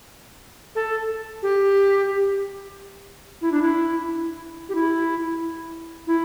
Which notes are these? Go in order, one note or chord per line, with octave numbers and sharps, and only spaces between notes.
A4
G4
E4
D4
E4
G4
E4
E4